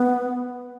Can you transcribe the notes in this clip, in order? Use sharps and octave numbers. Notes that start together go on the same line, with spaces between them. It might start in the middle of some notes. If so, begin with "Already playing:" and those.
Already playing: B3